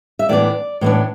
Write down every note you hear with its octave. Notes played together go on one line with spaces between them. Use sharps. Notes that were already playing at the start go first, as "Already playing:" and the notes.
E5
A2 E3 B3 D4 D5
A2 E3 B3 D4